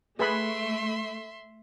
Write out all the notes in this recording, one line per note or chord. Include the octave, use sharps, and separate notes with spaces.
A3 G#4 B4 E5 B5 C6